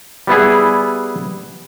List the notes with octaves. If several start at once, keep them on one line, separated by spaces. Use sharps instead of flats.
G3 B3 E4 G#4